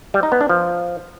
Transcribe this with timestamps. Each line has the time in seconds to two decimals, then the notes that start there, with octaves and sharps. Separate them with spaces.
0.14 G3
0.23 D#4
0.32 B3
0.41 D4
0.49 F3